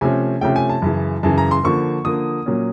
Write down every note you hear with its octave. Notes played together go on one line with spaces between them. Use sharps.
C3 F3 A3 C#4 G#5
C3 F3 A3 C#4 G5
G#5
A5
F#2 C#3 E3
F#2 C#3 E3 A5
A#5
C6
D3 F3 A#3 C#6
D3 F3 A#3 D#6
A#2 F#3 A#3 C#4